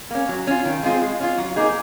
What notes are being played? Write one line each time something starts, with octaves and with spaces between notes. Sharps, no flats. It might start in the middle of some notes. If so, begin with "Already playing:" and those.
A#3 C#4
F#3
C#4 F4
D#3
G#3 C4 F4 G#4
G#3
C#4 F4
F#3
A#3 D#4 G#4